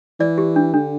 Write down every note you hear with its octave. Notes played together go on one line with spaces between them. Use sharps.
E3 D5
G4
D4
D3 D4